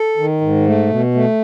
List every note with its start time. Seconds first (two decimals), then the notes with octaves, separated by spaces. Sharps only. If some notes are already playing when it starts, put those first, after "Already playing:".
Already playing: A4
0.17 D#3
0.41 G#2
0.66 A3
0.89 B2
1.14 A3